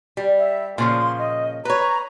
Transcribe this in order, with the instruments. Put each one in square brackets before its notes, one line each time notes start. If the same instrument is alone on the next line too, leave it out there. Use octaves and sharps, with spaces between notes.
[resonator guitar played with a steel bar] G3
[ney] E5
[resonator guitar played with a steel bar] A#2 C#3 F3 [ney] C6
[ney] D#5
[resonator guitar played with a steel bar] B4 C#5 [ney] A#5